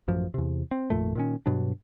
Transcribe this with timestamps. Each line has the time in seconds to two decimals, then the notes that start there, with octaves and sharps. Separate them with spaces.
0.08 A1 F#2 F3
0.34 E2 C3
0.71 C4
0.90 G#1 F2 A#2 A3
1.15 A#2 D#3 C#4
1.46 G2 B2 F#3 D4